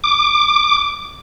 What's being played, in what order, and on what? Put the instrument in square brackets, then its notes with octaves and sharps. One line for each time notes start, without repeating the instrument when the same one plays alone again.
[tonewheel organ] D6